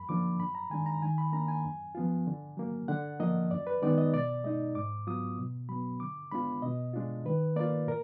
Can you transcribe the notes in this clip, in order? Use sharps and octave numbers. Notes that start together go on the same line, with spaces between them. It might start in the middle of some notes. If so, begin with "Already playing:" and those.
Already playing: F#2 B5
D3 F3 A#3 D4 D6
F#2 B5
A#5
D#3 G#3 D4 G#5
A#5
D#3 G#5
B5
A#3 D4 A#5
G#5
F#2
F3 B3 F4
D3
F#3 A#3
D3 F#5
F3 A#3 D4 D#5
F#2 D5
B4
D#3 G#3 B3 D#4 D5
D#5
B2 D5
G#3 D#4 D#5
G#2 D6
F#3 B3 F4 D#6
B2
F#3 B3 B5
D3 D6
G#3 B3 D4 F4 B5
B2 D#5
G#3 D4 F4
D#3 B4
A#3 F4 D5
A#2 A#4